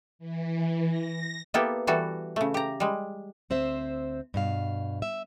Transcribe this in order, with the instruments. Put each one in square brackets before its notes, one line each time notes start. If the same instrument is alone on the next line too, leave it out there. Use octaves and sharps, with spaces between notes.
[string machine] E3
A#6
[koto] A#3 B3 E4 G4 A4
E3 G3 F#4 A4
C#3 A3
G4 A#5
G3 G#3
[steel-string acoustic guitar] D2 C4 C5 E5
G2 B2 F5
E5